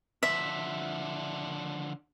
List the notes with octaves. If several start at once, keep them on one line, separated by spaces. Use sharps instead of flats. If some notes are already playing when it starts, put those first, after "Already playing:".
D3 F3 E5